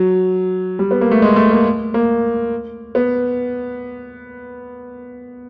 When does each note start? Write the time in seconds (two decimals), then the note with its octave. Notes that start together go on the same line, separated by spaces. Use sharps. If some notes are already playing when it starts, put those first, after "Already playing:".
Already playing: F#3
0.79 G3
0.91 B3
1.01 A#3
1.11 A3
1.22 G#3
1.36 A3
1.51 A#3
1.94 A#3
2.95 B3